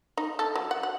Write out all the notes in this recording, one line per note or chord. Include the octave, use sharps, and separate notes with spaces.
D#4
A4
F#3
F#5
F#5